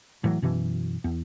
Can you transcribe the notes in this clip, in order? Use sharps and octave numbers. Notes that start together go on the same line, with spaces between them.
A2 E3 F#3
F#2 B2 E3
E2